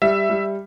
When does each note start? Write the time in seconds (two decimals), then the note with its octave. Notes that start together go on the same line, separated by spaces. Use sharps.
0.02 G3 E5
0.30 G3